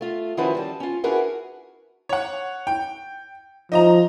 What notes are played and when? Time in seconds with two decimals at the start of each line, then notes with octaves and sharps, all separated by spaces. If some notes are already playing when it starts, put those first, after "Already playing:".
0.01 A3 F4
0.37 D#3 F3 C#4 E4 F#4 B4
0.55 G3 A5
0.80 C#4 F4
1.04 D4 E4 F#4 G#4 A#4 B4
2.09 C#5 F#5
2.67 G5
3.72 F3 D#4 D#5 A#5